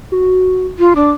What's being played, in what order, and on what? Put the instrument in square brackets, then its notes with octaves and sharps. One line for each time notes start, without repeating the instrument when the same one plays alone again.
[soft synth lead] F#4
[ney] F4
[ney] D4 [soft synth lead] D6